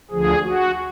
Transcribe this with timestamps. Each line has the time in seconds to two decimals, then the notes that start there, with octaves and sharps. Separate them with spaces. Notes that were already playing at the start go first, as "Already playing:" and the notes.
0.11 D2 D3 F3 G#4
0.43 F#4